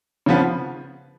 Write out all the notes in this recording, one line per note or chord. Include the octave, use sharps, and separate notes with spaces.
C#3 F3 B3